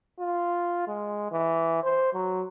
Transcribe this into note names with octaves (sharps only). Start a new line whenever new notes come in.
F4
G#3
E3
C5
F#3